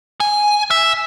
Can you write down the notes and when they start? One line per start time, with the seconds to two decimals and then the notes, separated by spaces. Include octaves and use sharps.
0.20 G#5
0.71 E5